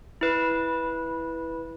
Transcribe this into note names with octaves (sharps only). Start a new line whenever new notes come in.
E4 B4